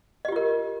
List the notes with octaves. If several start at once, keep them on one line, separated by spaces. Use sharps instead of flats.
F4 G4 A#4 D#5